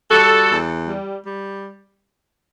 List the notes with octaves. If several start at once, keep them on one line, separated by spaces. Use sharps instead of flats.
G3 F#4 A4
E2
G3
G3